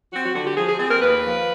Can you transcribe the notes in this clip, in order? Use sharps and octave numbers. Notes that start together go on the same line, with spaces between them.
C4 F#4
F#4
D3 F#4
G4
F3 G#4
G#4
C4 G#4
A#4
D#2 B4
F3